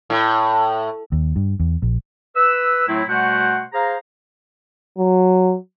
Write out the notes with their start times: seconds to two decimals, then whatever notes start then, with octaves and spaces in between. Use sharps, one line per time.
0.10 A2
1.12 D#2
1.36 G2
1.59 E2
1.82 A#1
2.36 B4 E6
2.88 A2 F#3 A3 C4 E4
3.09 B2 G3 A3 F#4 C5 F#5
3.73 G#4 C5 F5 A#5
4.98 F#3